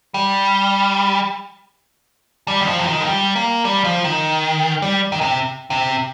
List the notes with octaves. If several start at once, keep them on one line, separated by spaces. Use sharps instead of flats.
G3
G3
D#3
F3
C3
D#3
F3
G3
A#3
G3
F3
D#3
G3
D#3
C3
C3